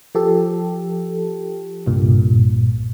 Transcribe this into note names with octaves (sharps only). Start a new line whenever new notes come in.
F3 G4 A4
C2 G2 A#2